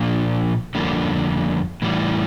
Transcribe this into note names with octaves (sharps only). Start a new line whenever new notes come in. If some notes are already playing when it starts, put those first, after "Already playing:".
Already playing: A#2 F3 A#3 D4
F2 D3 G3 A#3
A2 E3 G3